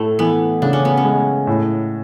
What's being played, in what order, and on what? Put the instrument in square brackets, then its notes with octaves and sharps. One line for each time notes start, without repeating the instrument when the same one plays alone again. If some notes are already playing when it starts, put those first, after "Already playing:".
Already playing: [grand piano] A2 [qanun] A3
[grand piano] E3 [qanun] B3
[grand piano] C#3 [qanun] D4
[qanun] C#4
B3
C#4
[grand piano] G#3
A2